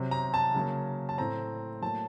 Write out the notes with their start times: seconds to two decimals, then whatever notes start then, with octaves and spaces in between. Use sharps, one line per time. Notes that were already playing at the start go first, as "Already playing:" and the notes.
Already playing: C3 F#3 C4
0.11 A#5
0.34 A5
0.54 C#3 F#3 A#3
1.09 A5
1.18 A2 A3 C4 A#5
1.82 A2 F#3 A#3 A5